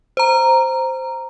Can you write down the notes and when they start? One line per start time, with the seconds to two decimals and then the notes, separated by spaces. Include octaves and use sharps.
0.17 C5 A#5